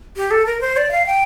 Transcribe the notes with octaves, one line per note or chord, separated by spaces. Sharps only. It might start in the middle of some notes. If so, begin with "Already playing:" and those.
G4
A4
A#4
C5
D5
F5
G5